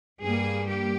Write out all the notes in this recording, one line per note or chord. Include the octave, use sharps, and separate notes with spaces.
G2 G3 A#3 G#4
G4